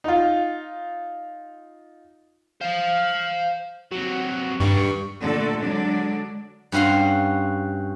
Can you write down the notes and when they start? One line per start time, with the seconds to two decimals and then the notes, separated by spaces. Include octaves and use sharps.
0.04 D#4 F4
2.61 C5 F5 A5
3.91 C3 F#3 F#4
4.60 G2 D#3 D4 C#6
5.21 A#2 D3 A3 A4
5.61 D3 F#3 G#3 D4
6.72 G2 C#4 F#4 F5 C6